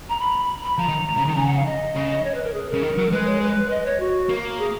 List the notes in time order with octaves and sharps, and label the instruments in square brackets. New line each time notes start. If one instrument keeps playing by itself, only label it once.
[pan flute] A#5
B5
B5
[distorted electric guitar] F3 [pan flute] A#5
[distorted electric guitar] D#3
C#3
D#3
[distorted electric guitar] C#3 [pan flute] G#5
[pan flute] F#5
F5
D#5
[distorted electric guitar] C#3
[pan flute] C#5
B4
A#4
G#4
A#4
[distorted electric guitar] C#3
D#3
F#3
[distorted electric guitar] G#3 [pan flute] B4
[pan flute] C#5
B4
D#5
C#5
F#4
[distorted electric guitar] A#3
[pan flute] G#4